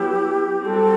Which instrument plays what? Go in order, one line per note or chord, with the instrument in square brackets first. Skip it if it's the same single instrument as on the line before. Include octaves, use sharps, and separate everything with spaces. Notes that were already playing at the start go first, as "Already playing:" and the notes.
Already playing: [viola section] F#3 B3 E4 [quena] G4
[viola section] G3 C4 F#4 [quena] A4